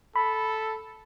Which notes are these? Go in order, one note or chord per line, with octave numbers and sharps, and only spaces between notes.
A4 B5